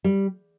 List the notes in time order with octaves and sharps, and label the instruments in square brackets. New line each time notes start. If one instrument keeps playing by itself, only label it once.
[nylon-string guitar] G3